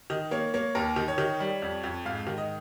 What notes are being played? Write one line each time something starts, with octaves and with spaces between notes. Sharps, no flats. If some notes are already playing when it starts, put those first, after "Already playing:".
D#3 D#5
A#3 C#5
A#3 C#5
D#2 A#4
D#3
C#5
D#3
G3
F2
F2
G#2 F5
D#3
D#5